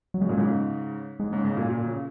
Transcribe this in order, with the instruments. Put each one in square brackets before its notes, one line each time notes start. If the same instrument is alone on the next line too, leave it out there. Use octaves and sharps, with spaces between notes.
[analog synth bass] F#3
[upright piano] C#3 [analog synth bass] G#3
[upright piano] A#2
G#2 C#3
[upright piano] G#2 [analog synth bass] G#3
[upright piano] G#2 C#3
G#2 C#3
A#2
A#2
C#3